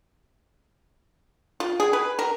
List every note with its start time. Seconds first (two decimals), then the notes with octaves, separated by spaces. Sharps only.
1.60 F4
1.80 G#4
1.93 B4
2.19 A#4